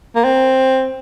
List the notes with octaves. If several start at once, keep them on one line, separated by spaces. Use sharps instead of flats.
A#3
C4